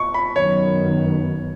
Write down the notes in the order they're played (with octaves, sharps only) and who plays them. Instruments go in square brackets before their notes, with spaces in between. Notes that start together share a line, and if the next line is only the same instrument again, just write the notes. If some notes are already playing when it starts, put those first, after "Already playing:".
Already playing: [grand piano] C#6
B5
[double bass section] F#2 D#3 F#3 B3 [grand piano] C#5